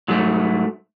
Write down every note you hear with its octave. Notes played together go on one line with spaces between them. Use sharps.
G#2 F#3 A3